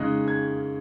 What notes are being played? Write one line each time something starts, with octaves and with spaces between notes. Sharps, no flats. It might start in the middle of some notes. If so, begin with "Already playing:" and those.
Already playing: C#3 G#3 D#4 F#6
G#6